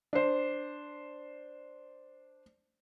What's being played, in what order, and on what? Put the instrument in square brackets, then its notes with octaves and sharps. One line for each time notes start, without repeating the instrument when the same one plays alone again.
[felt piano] D4 C5